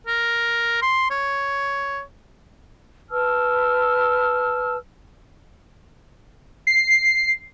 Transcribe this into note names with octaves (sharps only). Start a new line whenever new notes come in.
A#4
C6
C#5
B4 A5 E6 F6
C7